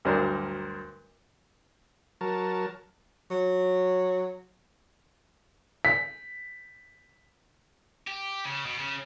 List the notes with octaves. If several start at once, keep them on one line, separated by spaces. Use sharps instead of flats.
D2 G2 F#3 D4 A#4 C5
F#3 A#4 A5
F#3
B6
G4
C#3
B2
C#3